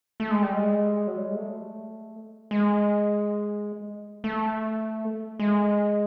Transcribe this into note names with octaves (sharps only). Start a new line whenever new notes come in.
A3
G#3
G3
G#3
F#3
G3
G#3
A3
G#3
A3
G#3